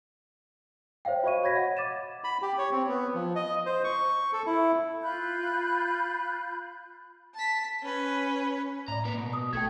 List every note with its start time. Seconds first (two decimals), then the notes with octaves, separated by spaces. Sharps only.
1.05 C5 C#5 E5 F5 G5
1.24 F#4 C5 D#5 C#6 D#7
1.43 C#5 B5 G#6 A#6 B6
1.55 D#5 F#5
1.77 D6 A6 D#7 E7
2.24 B5
2.42 G4
2.58 C#5
2.72 C4
2.88 B3
3.14 F3
3.36 D#5
3.66 C5
3.84 C#6
4.33 A4
4.46 E4
5.02 F4 B5 F#6 G6
7.35 A5 B6
7.83 C#4 B4
8.88 A2 D5 A#5
9.05 A#3 B4
9.18 B2
9.33 D#6
9.53 A1 A3 A4 G5 G#6